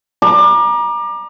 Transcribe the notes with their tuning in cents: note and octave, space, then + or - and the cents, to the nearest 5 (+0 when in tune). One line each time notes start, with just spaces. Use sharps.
A#5 +30 D6 +30